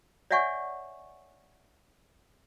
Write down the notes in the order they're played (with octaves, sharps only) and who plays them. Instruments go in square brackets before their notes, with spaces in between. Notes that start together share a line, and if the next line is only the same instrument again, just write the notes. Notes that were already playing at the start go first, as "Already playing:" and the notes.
[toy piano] C#5 D5 E5 F#5 G#5 C#6